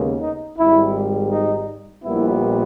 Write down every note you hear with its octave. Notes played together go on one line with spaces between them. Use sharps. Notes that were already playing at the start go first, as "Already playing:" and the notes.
Already playing: D#2 C#3 G#3 B3
D#4
G#1 G#2 G3 E4
D#4
A#1 A#2 G3 B3 E4